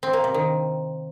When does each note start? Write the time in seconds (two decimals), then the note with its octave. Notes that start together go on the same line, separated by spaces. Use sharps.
0.03 C4
0.13 A#3
0.24 C3
0.34 D#3